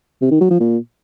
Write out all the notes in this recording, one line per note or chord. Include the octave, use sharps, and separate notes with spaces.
C3
D#3
F#3
F3
A#2